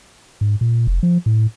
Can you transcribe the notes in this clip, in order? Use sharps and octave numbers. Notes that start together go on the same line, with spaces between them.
G#2
A#2
F1
F3
A2